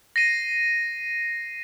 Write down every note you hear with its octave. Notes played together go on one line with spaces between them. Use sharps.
A#6 C7 D#7